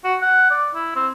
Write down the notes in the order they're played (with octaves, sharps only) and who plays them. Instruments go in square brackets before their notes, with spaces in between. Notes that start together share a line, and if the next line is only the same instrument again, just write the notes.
[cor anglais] F#4
F#5
D5
E4
C4